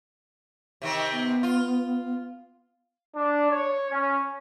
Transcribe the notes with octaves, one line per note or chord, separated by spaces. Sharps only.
C3 D#3 C4
B3
F4
D4
C#5
C#4